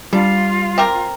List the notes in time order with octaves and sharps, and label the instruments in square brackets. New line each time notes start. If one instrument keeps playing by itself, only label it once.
[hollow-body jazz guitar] G3 [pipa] D4 [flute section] F4
[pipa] C4 G4 A#4